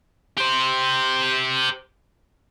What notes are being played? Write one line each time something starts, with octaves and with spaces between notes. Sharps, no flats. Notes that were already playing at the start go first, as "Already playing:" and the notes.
G4 C5